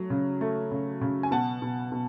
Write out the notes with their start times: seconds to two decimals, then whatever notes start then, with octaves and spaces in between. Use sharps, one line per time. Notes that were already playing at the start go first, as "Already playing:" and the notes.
Already playing: F#3 A3
0.10 C#3
0.41 A3
0.71 C#3
1.01 C#3
1.23 G#5
1.31 B2 F#5 A5
1.62 B2
1.92 B2